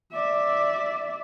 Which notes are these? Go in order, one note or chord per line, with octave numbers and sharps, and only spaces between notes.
D5 E5